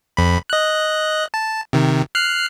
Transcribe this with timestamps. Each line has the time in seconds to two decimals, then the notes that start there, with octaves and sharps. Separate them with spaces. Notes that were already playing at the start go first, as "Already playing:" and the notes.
0.17 F2 B5
0.50 D#5 F#6
1.34 A5
1.73 C3 D#3
2.15 F6 F#6 C7